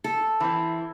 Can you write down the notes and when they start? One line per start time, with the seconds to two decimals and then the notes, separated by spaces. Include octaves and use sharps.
0.04 A4
0.40 E3 C4 E4